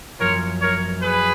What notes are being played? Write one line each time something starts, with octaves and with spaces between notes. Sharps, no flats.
F#2 F3 A#3 F4 A#4 C#5
A#4 C#5
G#4 B4